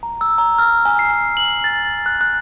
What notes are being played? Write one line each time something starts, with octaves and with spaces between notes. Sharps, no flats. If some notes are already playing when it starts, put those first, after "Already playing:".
A#5
E6
A#5
F6
G#5
C7
F#7
A6
F#6
F#6